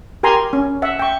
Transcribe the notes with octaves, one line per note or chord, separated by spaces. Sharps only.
G4 A#4 G#5 A#5 C6
C#4
E5 F#5
G5 C#6